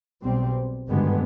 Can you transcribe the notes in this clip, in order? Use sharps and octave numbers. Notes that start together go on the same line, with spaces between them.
B1 B2 G3 C4
G#1 G2 D3 G#3 B3